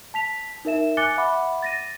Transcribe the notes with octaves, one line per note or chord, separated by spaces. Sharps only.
A5 B6 F7
D#4 A#4 E5 E7
G#5 D6 F#6 A6 C#7 G7
E5 F#5 B5 D6
A6 A#6 D#7